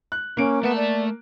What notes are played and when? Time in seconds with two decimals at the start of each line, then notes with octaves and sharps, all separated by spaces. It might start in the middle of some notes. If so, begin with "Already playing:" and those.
0.12 F#6
0.37 A#3 C#4 D7
0.63 A3 B3 A5
0.76 D5